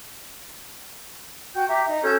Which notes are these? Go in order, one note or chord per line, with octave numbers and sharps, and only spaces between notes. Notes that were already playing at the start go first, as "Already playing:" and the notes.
F#4 G5 G6
G4 E5 A#5
D#4
C#4 F#4 A4 G6